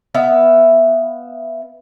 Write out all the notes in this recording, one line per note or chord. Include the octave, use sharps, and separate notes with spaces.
B3 E5 F5